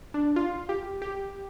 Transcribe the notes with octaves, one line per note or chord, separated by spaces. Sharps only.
D4
F4
G4
G4